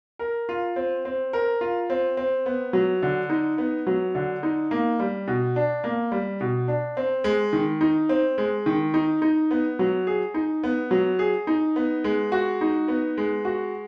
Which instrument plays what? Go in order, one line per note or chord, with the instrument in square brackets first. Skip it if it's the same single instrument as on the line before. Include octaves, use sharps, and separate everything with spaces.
[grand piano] A#4
F4
C4
C4
A#4
F4
C4
C4
B3
F#3
D3
D#4
B3
F#3
D3
D#4
A#3
G3
B2
D4
A#3
G3
B2
D4
C4
G#3
D#3
D#4
C4
G#3
D#3
D#4
D#4
B3
F#3
G#4
D#4
B3
F#3
G#4
D#4
B3
G#3
F#4
D#4
B3
G#3
F#4